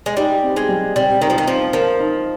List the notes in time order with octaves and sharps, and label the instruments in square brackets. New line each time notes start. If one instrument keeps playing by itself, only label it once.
[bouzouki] G#3
[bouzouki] G3 [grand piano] D#4
[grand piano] C4
[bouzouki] G#3
[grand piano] G3
[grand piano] C3 [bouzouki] G3
[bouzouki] D#3 [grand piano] D#4
[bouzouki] F3
D#3
[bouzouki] F3 [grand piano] C4
[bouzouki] F3 [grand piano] A#4
[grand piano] D#4